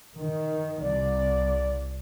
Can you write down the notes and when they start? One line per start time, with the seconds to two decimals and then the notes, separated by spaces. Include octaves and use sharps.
0.17 D#3
0.81 C2 D5